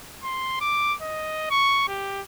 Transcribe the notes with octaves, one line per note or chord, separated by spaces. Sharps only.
C6
D6
D#5
C#6
G4